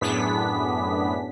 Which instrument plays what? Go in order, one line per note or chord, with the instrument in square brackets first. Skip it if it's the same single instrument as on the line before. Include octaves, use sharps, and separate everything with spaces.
[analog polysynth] F#2 A2 B3 D4 G#4 B6